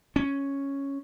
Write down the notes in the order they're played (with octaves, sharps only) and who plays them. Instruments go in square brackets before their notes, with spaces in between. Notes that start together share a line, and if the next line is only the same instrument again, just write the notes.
[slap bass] C#4